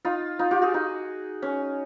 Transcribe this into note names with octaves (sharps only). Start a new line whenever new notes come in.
D#4 F4
D#4 F4
F4 G4
F#4 G#4
D#4
C#4